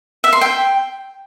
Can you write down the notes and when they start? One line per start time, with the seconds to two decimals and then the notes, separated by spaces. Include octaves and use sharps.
0.24 E5
0.33 C6
0.41 G5